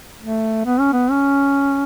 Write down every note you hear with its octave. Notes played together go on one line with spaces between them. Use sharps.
A3
B3
C#4
B3
C#4